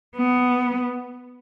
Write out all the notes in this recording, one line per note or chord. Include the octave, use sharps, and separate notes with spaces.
B3